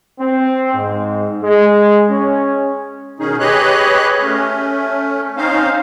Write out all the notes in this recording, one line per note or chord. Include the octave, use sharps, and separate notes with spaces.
C4
G#2
G#3
C#4
B2 D#3 C#4 D#4 G#4
G4 G#4 B4 C#5 D#5 F#6
A3 C#4
C4 C#4 D#4 C5 F5